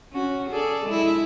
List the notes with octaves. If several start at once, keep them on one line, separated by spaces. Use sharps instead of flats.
C#4 F#4
G#4 A4 D5
G#3 E4